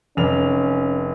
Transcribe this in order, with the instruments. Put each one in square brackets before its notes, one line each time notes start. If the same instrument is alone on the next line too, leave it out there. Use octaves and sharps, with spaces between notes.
[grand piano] F1 F7 [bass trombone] C#4